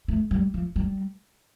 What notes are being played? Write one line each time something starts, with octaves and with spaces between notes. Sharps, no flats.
A3
G3
F3
G3